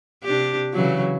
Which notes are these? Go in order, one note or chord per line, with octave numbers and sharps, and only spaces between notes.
C3 D4 G4
C#3 E3 F#3